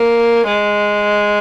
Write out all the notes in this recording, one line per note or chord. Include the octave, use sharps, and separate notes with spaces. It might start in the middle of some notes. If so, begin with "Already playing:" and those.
Already playing: A#3
G#3